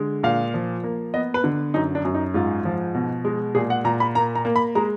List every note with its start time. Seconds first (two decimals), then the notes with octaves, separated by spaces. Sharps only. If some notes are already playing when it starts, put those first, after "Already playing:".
Already playing: D3 G#3
0.23 A#2 F5
0.54 F3
0.84 A#3
1.14 B3 D#5
1.34 B4
1.44 D3
1.74 F#2 D#4
1.95 D4
2.05 F#2
2.14 D#4
2.34 G#2 F4
2.65 F3
2.95 B2
3.25 G#3
3.55 A#2 G#4
3.70 F#5
3.84 A#2 A#5
4.00 B5
4.15 A#3 A#5
4.35 A#5
4.45 A#3
4.56 B5
4.75 G#3 A#5